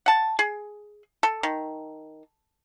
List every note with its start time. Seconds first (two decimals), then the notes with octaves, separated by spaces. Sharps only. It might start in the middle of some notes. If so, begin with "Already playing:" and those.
0.06 F#5 A5
0.39 G#4
1.23 A4
1.43 D#3